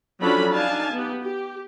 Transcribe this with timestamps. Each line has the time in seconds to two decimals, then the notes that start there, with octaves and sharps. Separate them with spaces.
0.21 F3 F#3 C#4 D4 A4 B5
0.52 D4 D#4 F5 G#5 A5
0.93 B3 G4
1.23 G4